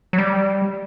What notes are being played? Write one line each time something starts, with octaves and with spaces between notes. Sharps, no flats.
F#3
G3